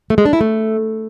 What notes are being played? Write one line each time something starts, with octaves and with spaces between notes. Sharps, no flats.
A3
G#3
D4
E4
A3